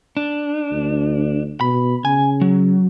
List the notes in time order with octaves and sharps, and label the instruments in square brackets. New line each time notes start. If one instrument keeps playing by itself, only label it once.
[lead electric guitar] D4
[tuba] D2
[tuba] B2 [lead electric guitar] B5
[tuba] C#3 [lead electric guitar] G#5
[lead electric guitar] F#3